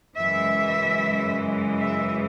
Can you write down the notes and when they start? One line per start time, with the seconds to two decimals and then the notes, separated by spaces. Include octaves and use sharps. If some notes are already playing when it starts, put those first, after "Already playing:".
0.17 F#2 C#3 E3 G#3 E5
1.77 E5